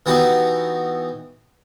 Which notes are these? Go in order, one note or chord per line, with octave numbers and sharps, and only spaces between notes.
E3 B3 D#4 F#4 G4